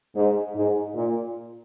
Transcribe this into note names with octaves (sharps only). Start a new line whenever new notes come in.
G#2
G#2
A#2